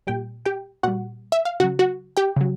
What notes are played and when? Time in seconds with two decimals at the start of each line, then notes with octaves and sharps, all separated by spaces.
0.07 A#2 G3 G4 G5
0.45 G4 G5
0.83 A#2 G3 F#4 F#5
1.32 E5
1.45 F5
1.60 C#3 F#3 F#4 F#5
1.79 F#4 F#5
2.17 G4 G5
2.36 C#3 F#3